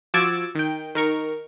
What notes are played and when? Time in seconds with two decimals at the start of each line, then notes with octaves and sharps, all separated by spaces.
0.14 F3 F#4 D6 E6 G#6 A6
0.55 D#3 G5
0.95 D#3 A#4 C#6